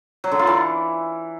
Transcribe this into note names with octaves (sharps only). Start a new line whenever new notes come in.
F#3
D3
F4
E3